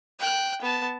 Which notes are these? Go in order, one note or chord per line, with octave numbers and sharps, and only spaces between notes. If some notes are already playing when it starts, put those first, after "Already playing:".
G5 F#6
B3 A5